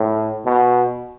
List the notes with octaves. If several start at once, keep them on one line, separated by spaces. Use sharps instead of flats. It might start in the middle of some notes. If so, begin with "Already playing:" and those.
Already playing: A2
B2